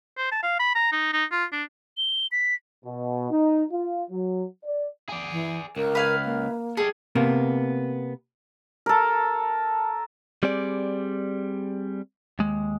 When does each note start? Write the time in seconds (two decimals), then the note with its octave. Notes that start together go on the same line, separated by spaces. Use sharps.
0.17 C5
0.32 A5
0.43 F5
0.59 B5
0.75 A#5
0.92 D#4
1.13 D#4
1.32 F4
1.52 D4
1.97 G7
2.32 B6
2.85 B2
3.31 D#4
3.71 F4
4.11 F#3
4.64 D5
5.09 G#4 D5
5.31 E3
5.76 C#2 A#4
5.95 B4 F5 G#5
6.25 A#3
6.77 G3 G#4 A4
7.15 C3 A#3 B3
8.86 A4 A#4
10.43 G3 C4 G#4 D5
12.39 D#2 G#3